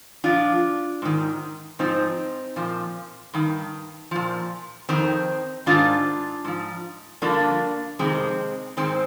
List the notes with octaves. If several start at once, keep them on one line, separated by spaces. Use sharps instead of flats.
A#2 F3 D4 F4
G#2 D#3
G#2 F3 C4 D#4
A#2 F3
G2 D#3
A#2 F3
F2 D#3 C4 D#4
G#2 D#3 D4 F4
G#2 F3
G2 D3 F3 A#3 D4
F2 C3 D#3 G#3 C4
G#2 D#3 G#3 C4